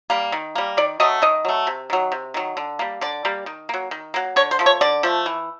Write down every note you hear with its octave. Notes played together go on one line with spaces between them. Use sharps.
G3 A#3
D#3
G3 A#3
D#3 D5
F#3 A3 D#5
D#3 D#5
F#3 A3
C3
D#3 F#3
C3
D#3 F#3
D3
G3 A#3
D3 D5
G3 A#3
D#3
F#3 A#3
D#3
F#3 A#3
D3 C#5
C5
F3 A3
C#5
D3 D5
F3 A3
E3